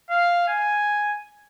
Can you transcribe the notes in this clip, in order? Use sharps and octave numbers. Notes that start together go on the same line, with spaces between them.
F5
G#5